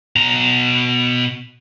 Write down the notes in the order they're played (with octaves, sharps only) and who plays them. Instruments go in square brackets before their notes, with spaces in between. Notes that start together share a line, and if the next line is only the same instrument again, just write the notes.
[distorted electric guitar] B2 A#5